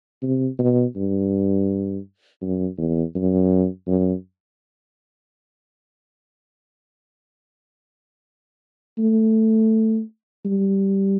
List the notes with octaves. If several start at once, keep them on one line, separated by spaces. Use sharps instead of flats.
C3
B2
G2
F#2
E2
F#2
F#2
A3
G3